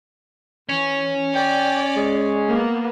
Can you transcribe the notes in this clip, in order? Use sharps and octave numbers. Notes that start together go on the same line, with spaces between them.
E3 C#4
D5 G5
G#3
A#3 B3